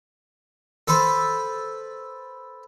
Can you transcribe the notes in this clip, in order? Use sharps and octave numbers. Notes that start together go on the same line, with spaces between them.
A4 B4 C5